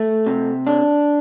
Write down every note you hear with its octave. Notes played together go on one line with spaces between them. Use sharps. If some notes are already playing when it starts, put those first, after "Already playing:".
Already playing: A3
C3
D4